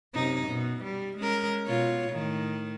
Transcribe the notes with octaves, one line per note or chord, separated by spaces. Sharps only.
F#2 C3 D#4
B2
G3
G#3 C#4 A#4
B2 F4 C#5
A2 D#3